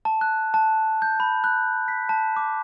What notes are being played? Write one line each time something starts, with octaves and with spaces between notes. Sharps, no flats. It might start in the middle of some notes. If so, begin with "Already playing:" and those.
A5
F#6
A5
G6
B5
F#6
B6
A5
D6